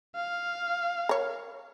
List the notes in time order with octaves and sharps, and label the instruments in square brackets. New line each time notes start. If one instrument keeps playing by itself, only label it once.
[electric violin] F5
[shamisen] A#4 C#5